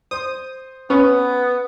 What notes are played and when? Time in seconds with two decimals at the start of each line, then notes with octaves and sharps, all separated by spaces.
0.11 C5 D#6
0.90 B3 C#4 B4